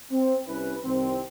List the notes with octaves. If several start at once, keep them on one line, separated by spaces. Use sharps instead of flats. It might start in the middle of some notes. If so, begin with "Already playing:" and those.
C4
C2 C#4 E4 B4
C2 D#3 C4